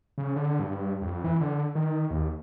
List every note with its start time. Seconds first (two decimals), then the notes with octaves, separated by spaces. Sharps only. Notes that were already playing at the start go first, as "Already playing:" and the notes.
0.18 C#3
0.36 D3
0.59 G2
1.02 F2
1.24 E3
1.41 D3
1.75 D#3
2.10 D#2